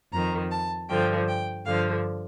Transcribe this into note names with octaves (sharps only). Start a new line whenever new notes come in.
F2 D#3 A#5
A5
G2 D3 F3 G5
G5
G2 D3 F3 F5